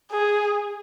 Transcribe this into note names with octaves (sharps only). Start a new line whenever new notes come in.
G#4